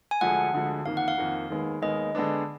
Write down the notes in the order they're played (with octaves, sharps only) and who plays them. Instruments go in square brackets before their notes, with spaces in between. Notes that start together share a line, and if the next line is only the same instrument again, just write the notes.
[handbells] G#5
[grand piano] D2 D3 F3 G#3 [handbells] F#5
[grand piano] D2 D3 F3 G#3
[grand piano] F2 D#3 A#3 [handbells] F5
[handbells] F#5
F5
[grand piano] F2 D#3 A#3
D#2 D#3 G#3 B3
[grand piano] D#2 D#3 G#3 B3 [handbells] D#5
[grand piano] D3 G#3 B3 D4